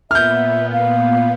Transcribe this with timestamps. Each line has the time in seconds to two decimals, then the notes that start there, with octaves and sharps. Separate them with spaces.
0.11 A#2 B3 E5 F6 G6
0.73 F5